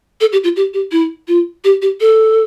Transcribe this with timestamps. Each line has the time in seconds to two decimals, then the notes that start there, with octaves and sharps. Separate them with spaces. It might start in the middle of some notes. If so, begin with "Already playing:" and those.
0.21 A4
0.32 G4
0.44 F4
0.56 G4
0.74 G4
0.92 E4
1.28 F4
1.64 G4
1.82 G4
2.01 A4